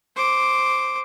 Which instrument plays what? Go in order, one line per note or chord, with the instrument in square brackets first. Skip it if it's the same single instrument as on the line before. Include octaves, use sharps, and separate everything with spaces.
[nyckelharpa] C5 D6